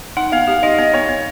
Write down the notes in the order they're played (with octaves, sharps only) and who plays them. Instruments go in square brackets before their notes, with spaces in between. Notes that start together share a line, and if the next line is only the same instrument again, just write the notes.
[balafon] D#4 [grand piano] F#5
[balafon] B3 [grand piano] F5
[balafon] G4 [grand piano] F5
[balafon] D#4 [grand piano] D#5
[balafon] B3 [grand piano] D#5
[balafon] B3 [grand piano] C#5
[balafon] B3